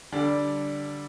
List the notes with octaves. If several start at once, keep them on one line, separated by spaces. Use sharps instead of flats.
D3 G3 D4